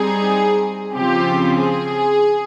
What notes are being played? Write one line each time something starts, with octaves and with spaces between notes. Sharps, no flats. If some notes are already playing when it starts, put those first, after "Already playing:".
Already playing: G3 C4 D#4 G#4
C#3 F3 C4 F4 G4
G#4